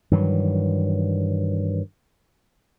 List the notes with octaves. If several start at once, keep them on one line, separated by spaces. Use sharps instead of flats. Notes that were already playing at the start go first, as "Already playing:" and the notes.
G2 D#3 E3 F#3